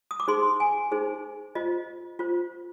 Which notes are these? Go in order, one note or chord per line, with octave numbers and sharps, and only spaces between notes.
D#6
D6
D#4 G#4 C5 C6
G#5
D#4 G#4 C5
F4 C5 D#5
F4 C5